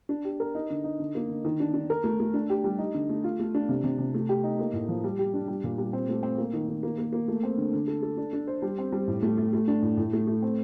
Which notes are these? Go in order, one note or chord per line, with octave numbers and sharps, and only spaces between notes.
D4
G4
A#4
D#4
D3
D#4
D3
A#3
D3
D#3
D4
D4
A#4
A3
A3
D4
G4
G3
D#4
D3
A3
F4
A3
D4
C3
C3
C3
A3
G4
D#4
A#3
A2
F3
G3
G4
D4
G3
A#2
G3
C4
A3
C4
A#3
D#3
D#3
A#3
A#3
A#3
A3
C4
D3
D3
A4
A4
D4
D4
C5
G3
C4
G3
A2
A3
A3
A3
D4
A2
A2
A3
A3
C4